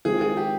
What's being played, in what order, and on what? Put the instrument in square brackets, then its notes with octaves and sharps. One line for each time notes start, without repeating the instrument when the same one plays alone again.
[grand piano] D#3 G#3 C4 F4 [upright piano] G#4
[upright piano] G#4
G4